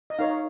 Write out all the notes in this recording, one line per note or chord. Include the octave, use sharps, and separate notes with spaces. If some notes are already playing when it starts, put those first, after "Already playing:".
D#5
D#4 A#4 C#5 F5